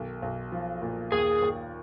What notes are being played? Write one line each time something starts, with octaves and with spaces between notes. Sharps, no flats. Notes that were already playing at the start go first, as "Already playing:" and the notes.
Already playing: B1 D#3
B1
F3
A#2
D#2 G#4
D#2